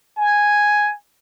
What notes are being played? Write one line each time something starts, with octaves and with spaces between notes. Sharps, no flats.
G#5